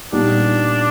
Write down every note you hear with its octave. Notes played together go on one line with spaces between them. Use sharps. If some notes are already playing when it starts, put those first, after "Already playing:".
A#2 G3 B3 D4 D#4